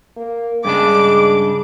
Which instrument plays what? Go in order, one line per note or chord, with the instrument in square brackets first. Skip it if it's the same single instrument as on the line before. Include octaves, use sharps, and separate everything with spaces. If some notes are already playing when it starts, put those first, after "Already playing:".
[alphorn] A#3
[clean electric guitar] G2 C#3 D4 [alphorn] G#3 [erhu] D6